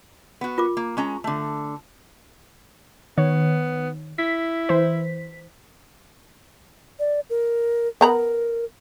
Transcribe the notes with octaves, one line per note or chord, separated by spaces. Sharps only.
B3 F#4
F4 A#4 D6
A#3
G#3 C#4 A#5
D3 A3
D#3 B3 C#5
E4 B6
E3 C5
D5
A#4
B3 A#4 A#5 B5